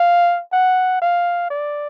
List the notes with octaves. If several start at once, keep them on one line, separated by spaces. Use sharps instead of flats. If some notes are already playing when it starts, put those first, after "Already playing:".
Already playing: F5
F#5
F5
D5